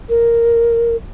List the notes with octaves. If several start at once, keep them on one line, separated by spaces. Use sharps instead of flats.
A#4